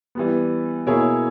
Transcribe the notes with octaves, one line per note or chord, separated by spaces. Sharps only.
E3 G3 B3
B2 A#3 E4 G#4 C#5